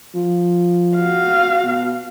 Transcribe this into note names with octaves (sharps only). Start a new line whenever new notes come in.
F3
F#4 F5
B2